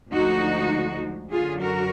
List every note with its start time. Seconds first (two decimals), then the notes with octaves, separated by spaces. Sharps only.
0.11 D2 D3 F3 G#3 D#4 F#4
1.31 F#2 D3 F#3 F4 G#4
1.61 F#4 A#4